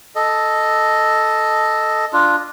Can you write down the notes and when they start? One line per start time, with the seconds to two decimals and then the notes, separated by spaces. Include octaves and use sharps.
0.15 A4 D#5
2.13 D4 F4